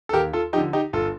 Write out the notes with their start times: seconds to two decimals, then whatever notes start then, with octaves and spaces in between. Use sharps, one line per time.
0.09 A4
0.13 D#2 G4 A#4
0.33 F4 A4
0.53 F3 D#4 G4
0.58 D3
0.73 D#4 G4
0.93 G1 F4 A4